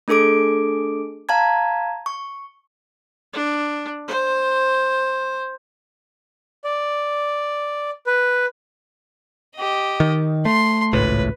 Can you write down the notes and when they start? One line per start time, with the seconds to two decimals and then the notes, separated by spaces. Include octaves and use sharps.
0.08 A3 D4 G#4 A4 D6 D7
1.29 F5 A5 A#5 G#6
2.06 C#6
3.33 D4
4.08 C5
6.64 D5
8.07 B4
9.56 G4 D#5
10.00 D#3
10.45 A3 C6
10.93 G#1 C#2 A2 B4